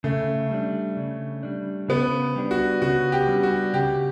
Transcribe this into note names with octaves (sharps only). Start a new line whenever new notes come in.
C#3 A3
G3 D4
C#3
G3 D4
C#3 B3
G3 D4
F#4
C#3 F#4
G4
G3 D4
F#4
C#3 G4